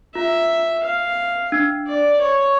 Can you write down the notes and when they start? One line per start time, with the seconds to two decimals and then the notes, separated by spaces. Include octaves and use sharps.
0.15 F4 E5
0.84 F5
1.52 D4
1.87 D5
2.21 C#5